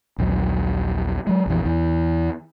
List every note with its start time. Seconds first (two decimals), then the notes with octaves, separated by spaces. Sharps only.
0.18 A#1 D#2 F#3
1.27 F#3 G#3
1.46 A#1 F2 E3
1.65 E2 E3